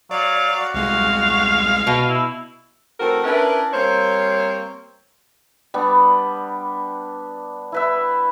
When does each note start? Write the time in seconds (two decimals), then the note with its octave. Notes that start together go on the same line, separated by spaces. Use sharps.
0.11 F#3 D5 F5
0.57 F#4
0.74 C2 G#3 F5
1.87 B2
2.09 E4
3.00 E3 A3 C4 F#4 A4 A#4
3.24 C#4 D4 E4 A#4 B4
3.73 G3 A#3 C4 C5 C#5
5.74 G3 B3 D4
7.72 E4 B4 E5